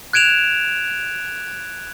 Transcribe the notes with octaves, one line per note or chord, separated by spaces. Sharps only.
F#6 G#6 D7 E7 F7